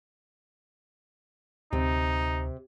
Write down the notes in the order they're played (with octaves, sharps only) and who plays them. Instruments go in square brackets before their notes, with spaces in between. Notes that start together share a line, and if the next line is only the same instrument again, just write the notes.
[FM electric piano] D2 [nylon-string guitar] C3 [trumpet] D#4